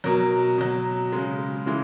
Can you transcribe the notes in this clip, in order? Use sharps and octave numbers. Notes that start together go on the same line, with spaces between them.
B2 F#3 A#4
B2 F#3
C#3 G#3
C#3 E3 G#3